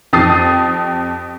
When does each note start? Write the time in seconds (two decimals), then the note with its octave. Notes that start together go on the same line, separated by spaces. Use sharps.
0.13 F2 G4 D#6 A6 C7